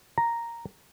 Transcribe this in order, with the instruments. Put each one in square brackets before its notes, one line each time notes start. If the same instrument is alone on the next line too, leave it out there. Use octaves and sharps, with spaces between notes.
[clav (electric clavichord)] A#5